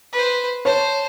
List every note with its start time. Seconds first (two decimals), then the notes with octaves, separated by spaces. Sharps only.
0.13 B4 C5
0.65 C5 C#5 A5